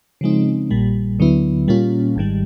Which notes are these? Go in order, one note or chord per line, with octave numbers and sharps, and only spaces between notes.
C#3 F3 G#3 C4 D#4
A#1 A#2 G3
D2 D3 F#3 B3 E4
A#2 G3 A#3 C#4 F4
G#1 G#2 D#3 G3